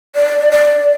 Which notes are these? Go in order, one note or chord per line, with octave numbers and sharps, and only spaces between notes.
D5
D5